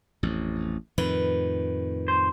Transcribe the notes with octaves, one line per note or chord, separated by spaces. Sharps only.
A1 F2
F2 A2 D#3 B4
C5